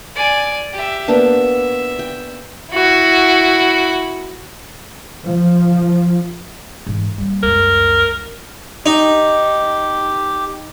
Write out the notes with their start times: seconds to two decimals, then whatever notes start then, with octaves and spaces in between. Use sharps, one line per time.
0.15 D5 G#5
0.73 G4 E5
1.08 A#3 B3 D4 E5
1.99 G5
2.73 E4 F#4
5.25 F3
6.87 G#2 E3
7.18 G3 A#3
7.43 C#2 F#2 A#4
8.86 D#4 G4